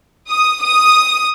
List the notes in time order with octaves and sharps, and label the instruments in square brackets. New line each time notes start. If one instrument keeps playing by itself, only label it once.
[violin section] D#6
D#6